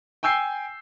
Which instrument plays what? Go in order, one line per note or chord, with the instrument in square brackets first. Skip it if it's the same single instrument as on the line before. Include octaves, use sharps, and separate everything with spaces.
[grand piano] G5 G#5 E6 G6 C7